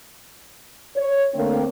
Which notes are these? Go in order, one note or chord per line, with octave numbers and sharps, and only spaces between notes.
C#5
D3 A3 A#3 C4